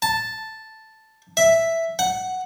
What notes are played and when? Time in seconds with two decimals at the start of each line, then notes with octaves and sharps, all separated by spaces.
0.02 A5
1.37 E5
1.99 F#5